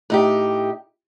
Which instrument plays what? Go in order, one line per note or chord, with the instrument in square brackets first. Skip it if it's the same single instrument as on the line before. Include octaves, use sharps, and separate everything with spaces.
[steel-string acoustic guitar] A2 D#4 G4